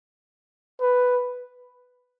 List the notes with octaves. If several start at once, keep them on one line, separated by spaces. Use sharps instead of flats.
B4